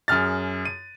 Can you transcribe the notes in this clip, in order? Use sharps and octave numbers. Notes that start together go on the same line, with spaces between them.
F#2 G#4 F6 A6
D#7